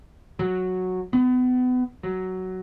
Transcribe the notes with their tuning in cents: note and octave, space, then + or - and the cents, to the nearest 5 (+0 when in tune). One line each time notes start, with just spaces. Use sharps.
F#3 -5
B3 +30
F#3 +10